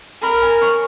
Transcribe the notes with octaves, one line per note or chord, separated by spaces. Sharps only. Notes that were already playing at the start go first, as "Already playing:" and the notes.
A#4 B5
G#5
C#5